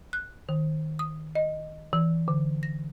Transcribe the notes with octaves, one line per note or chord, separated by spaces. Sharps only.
F#6
D#3
D#6
D#5
E3
D3
A#6